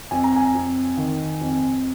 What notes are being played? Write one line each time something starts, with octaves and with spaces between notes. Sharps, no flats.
F2 G#5
A#5
G#5
F2
D#3
F2